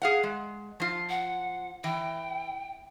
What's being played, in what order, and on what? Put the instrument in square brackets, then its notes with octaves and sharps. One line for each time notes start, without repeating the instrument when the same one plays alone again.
[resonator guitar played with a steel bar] G#4 F5 F#5
G#3
F3 F4
[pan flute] F#5
[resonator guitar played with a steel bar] E3 [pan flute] G5